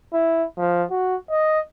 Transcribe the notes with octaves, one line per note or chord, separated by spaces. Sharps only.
E4
F3
F#4
D#5